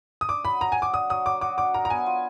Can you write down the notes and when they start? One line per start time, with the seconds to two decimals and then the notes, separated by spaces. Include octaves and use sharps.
0.21 D#6
0.29 D4 D6
0.45 F#3 B5
0.61 F#3 A#5
0.72 G#5
0.77 F#4 D6
0.93 D4 D#6
1.10 F#3 D#6
1.26 F#3 D6
1.41 F#4 D6
1.58 D4 D6
1.74 A#4 A#5
1.85 A#5
1.90 B3 G#5
2.06 F4